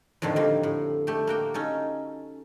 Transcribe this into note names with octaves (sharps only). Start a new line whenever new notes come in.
F2 A2 D3 D#3 F3
F2 G3 A#3
A2
A3 G4
A#3 F#4 G5
C#4 D#4 A4